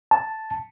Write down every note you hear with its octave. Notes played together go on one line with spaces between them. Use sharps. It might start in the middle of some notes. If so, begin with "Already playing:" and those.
A5